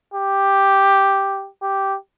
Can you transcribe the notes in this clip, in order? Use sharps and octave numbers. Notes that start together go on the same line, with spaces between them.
G4
G4